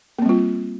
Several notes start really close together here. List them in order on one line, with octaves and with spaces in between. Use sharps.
A#3 C4 G3 F4